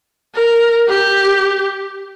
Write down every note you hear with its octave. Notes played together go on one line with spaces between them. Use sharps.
A#4
G4